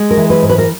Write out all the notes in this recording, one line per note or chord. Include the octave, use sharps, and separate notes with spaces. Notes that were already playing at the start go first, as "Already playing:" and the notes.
Already playing: G#3
A#4
E3
B4
G#2
B4
A#4